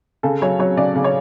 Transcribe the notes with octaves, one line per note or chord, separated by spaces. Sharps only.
C#3 A4
F#3 C#5
F#3 C#5
C#3 D5
C#3
C#5